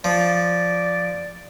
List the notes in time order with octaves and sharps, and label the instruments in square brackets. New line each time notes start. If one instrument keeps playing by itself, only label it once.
[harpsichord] F3 [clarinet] D5